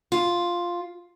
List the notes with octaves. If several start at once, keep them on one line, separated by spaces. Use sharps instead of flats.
F4